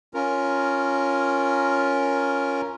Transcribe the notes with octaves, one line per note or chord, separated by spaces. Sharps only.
C#4 F4 A#4